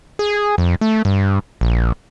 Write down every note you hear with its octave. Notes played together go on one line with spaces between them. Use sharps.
G#4
F2
A3
G2
A#1